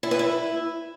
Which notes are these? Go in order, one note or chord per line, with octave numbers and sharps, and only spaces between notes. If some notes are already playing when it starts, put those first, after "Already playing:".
E4
B4
E4